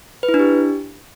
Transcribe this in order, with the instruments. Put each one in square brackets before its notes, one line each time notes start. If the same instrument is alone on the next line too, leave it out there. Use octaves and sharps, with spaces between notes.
[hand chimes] B4
E4
D4
G4